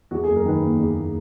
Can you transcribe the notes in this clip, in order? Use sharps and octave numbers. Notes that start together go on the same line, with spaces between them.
E2 F#4
G#4
F#1
A#4
D#3 B4
A#3
E2